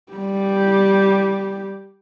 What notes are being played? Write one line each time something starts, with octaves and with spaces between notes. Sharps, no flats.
G3 G4